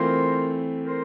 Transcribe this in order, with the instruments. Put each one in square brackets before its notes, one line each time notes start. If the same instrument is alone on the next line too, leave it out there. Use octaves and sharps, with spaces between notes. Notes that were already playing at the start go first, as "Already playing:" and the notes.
Already playing: [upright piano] E3 A3 C4 F4 [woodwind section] A#4 C5
[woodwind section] A#4 C5